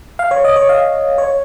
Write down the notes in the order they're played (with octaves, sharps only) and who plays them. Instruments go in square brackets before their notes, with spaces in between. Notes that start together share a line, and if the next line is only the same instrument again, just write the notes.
[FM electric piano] F5
C#5
D#5
C#5
F5
C#5